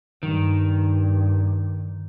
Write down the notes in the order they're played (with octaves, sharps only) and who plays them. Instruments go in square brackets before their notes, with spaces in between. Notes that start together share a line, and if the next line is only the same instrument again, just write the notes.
[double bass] G2 [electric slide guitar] D#3